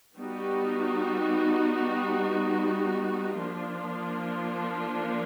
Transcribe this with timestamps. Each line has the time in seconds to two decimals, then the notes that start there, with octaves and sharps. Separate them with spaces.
0.18 G3 B3 D#4 F#4
3.37 F3 A#3 D4 F4